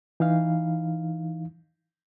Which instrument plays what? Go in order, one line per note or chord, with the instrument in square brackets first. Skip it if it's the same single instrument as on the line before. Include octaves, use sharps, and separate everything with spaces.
[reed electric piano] E3 D#4 E4 F5